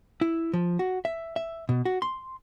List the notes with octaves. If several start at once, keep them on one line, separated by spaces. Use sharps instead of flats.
E4
F3
F#4
E5
E5
B2
F#4
C6